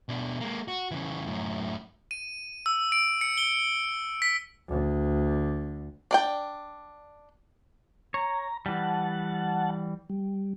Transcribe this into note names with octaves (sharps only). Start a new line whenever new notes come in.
B2 D4
G#3 A#3
F#4
C#3 E3
F#2 A2
D#7
E6
D7
C#7
G7
B6
D2 D3
D4 D5 G5
C#5 A#5
E3 G3 F#5 A5
G3